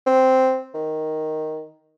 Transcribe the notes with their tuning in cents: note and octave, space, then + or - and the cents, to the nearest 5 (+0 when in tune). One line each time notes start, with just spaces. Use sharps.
C4 -5
D#3 +0